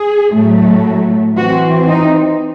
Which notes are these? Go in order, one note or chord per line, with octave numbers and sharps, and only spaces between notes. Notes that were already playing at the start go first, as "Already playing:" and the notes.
Already playing: G#4
A2 F#3 A3
E3 C4 F#4
D#4